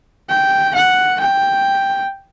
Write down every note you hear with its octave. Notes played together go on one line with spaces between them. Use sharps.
G5
F#5
G5